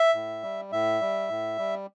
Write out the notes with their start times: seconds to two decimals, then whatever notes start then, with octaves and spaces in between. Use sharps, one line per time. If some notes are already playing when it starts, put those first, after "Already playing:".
Already playing: E5
0.15 A2
0.43 G3
0.72 A2 E5
1.01 G3
1.29 A2
1.58 G3